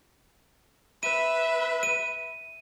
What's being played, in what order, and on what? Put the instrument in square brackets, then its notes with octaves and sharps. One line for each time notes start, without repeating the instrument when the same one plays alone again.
[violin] B4 E5 [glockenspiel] D#7
[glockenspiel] D#7